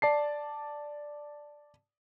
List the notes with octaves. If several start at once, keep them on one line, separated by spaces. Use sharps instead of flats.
D5 A5 C7